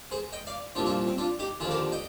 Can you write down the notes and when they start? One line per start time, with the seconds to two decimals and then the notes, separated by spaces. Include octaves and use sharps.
0.11 G#4 C5
0.33 D#5 G5
0.47 D5 F5
0.75 C2 A#2 F3 D4 F4
0.86 D4 F4
1.07 C4
1.18 D4 F4
1.39 D#4 G4
1.60 D#2 D3 F3 F4 G#4
1.71 A#4 D5
1.92 D#5 G5